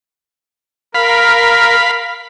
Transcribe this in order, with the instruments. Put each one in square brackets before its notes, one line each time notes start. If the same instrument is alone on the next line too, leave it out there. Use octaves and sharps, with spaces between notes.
[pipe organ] A#4 [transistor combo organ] F5 B5